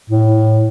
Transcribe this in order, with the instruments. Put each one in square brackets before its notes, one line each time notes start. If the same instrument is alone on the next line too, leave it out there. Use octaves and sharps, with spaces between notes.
[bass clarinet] A2